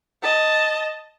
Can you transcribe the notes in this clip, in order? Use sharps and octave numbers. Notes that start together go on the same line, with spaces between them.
D#5 A5